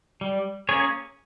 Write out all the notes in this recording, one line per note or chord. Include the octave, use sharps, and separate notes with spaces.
G3
A#3 C#4 G#4 C#5